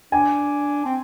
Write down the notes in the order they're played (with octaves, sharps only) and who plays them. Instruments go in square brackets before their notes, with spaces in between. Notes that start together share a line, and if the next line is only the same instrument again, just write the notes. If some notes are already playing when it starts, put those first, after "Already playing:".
[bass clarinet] D4 [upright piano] G#5
[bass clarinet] C4